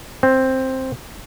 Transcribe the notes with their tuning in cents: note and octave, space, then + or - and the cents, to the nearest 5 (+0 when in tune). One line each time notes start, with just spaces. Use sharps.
C4 +5